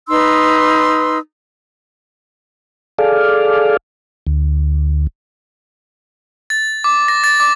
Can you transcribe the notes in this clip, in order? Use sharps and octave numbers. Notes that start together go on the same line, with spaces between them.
D#4 B4 C6 E6
G#4 A4 D5 F5
D2
A6
D6
A#6
A6
D6